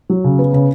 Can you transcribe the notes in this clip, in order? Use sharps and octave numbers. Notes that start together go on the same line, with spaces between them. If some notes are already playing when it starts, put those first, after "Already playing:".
F#3
C#3
B3
C#3